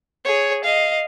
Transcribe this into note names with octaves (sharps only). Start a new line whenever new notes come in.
G#4 C#5
D#5 F5